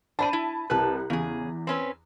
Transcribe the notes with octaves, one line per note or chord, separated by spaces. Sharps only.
D4 C5 D5 A5 B5 D#7
E4
C2 B4 A5 F#6
E2 C#3 G#4
C4 C#4 B4